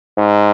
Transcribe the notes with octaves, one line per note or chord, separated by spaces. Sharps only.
G#2